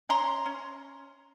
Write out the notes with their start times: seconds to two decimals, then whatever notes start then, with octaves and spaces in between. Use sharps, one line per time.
0.09 C#4 A#5 C6
0.46 C#4